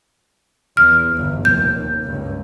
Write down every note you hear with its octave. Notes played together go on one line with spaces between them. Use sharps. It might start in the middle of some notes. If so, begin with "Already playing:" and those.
E2 F6
G1 E2
F1 D#2 G6
C#2 G2